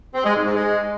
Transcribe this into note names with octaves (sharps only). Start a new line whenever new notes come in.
C4
G#3
G#2
G#2
G#3